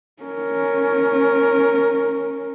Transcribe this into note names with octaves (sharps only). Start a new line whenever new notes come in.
C#4 A#4